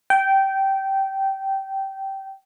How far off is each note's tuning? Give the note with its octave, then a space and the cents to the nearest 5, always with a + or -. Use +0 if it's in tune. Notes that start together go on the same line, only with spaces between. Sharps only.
G5 -15